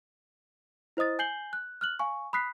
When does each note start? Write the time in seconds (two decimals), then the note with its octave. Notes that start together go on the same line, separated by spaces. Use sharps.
0.97 E4 C5 D#5 D#6 A6
1.19 G#5 G6 C7 F#7 G7
1.53 F#6
1.81 F6 F#6 F#7
1.99 F5 G#5 C#6
2.33 B5 D#6 F#6 B6 C7